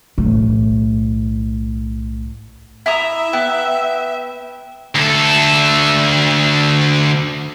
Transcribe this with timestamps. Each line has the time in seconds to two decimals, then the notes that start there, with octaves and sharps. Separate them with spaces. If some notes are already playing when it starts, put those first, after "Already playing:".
0.18 B1 A2
2.86 E4 E5 A#5 D#6
3.33 B3 G5
4.95 D2 A4